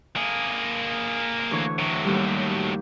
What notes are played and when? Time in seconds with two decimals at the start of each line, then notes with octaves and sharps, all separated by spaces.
0.16 A#3 G#4
1.51 D2 E3 C#5
1.79 A2 F#3
2.05 D#2 G3